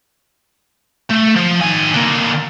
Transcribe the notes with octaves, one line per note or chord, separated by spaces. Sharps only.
A3
F3
D#3 G#5
D3 A#3